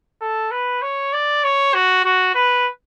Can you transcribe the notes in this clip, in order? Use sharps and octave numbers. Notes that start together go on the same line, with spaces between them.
A4
B4
C#5
D5
C#5
F#4
F#4
B4